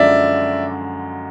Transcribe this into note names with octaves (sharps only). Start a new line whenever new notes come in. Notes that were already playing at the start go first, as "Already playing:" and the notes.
Already playing: F#2 D3 F3 G#3 D5 E5